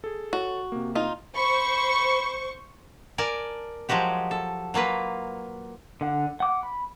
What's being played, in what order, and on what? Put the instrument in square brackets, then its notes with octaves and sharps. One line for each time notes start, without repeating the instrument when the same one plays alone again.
[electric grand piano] G#4 A4
[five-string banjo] F#4 [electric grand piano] A4 C#5
[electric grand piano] C3 A#3
[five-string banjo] D#4 F4
[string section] C5 C#6 [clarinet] B5
[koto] A#4 D5 G#5 A5
F3 F#3 G#3 F#4 G4
A4
F#3 A#3 F4 B4
[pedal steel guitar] D3 F#5
F#5 D6
B5